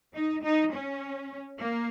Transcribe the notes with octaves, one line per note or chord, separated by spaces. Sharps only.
D#4
D#4
C#4
A#3